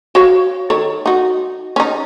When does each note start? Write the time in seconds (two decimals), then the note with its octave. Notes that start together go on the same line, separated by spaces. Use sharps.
0.15 F#4 C#5 F5
0.70 D#3 A4 C#5
1.06 D#4 F#4
1.76 C#4 D#4